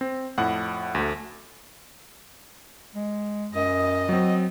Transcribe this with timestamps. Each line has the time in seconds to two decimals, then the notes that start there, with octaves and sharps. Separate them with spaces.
0.01 C4
0.38 F2 A2 F#5 F#6
0.95 D2 A3
2.95 G#3
3.54 F#2 D#5
4.09 F#3 C4